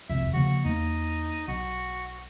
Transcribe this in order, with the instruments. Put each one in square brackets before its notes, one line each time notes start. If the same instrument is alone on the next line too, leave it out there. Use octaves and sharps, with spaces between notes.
[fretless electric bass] E1 C2 F2 [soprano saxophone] E5
[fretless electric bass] C#3 F3 A#3 [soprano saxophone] F#4
[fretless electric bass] E2 A#3 [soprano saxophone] D#4
[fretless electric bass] B1 [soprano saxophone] F#4